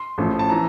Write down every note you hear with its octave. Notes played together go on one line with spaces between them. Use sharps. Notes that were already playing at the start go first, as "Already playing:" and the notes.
Already playing: C6
A1 A2 F3
A5
E3 A#5